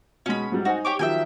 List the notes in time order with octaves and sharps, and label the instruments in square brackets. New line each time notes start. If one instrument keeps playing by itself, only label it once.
[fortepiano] B2 G#3 [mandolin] C#4 B5
[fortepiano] G#2 F#3 G3
[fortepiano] D#4 C5 G#5 [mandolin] F#4
[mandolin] G4 C#5 D6
[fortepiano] D#3 F3 F#3 [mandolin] E5 G5 G#5